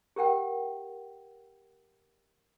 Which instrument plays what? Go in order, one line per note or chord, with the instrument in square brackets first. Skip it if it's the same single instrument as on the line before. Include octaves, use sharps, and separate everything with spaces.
[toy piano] G4 A#4 F#5 G5